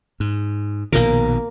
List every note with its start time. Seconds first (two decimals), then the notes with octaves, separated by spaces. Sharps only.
0.20 G#2
0.92 A#1 B2 D#3 A#3 A#4